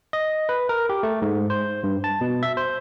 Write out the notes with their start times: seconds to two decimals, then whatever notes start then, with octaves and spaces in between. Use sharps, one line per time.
0.13 D#5
0.49 B4
0.69 A#4
0.89 G4
1.03 A3
1.22 G#2
1.50 C5
1.83 G2
2.04 A5
2.21 B2
2.43 E5
2.57 C5